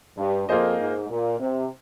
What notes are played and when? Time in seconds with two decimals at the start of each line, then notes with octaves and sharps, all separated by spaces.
0.18 G2
0.49 F2 A#3 F4 G#4 C5 D#5
0.79 G#2
1.09 A#2
1.40 C3